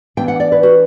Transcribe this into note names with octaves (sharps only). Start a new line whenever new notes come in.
E3 B3 D4 G5
F#5
D5
B4
F#4